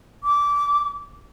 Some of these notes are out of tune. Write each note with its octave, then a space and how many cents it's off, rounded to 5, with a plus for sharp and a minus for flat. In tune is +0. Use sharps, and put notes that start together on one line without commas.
D6 -20